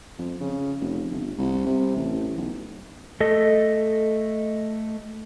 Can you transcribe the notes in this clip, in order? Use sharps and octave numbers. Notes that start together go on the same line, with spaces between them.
F2
C#3
F1
G1
C2
C3
A1
B1
A3 A4 D#5